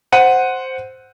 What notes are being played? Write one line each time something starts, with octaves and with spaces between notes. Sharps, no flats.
C5 F#5 D#7